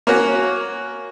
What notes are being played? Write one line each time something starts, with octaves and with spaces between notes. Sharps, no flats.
A#3 C#4 F#4